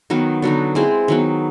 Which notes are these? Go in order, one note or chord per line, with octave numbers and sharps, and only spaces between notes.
D#3 F#3 B3
D3 F#3 B3 D#4
G#3 C4 E4 G#4
D#3 F#3 B3